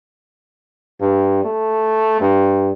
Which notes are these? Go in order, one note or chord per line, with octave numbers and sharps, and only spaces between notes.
G2
A3
G2